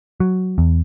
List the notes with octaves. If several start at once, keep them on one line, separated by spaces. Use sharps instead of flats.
F#3
E2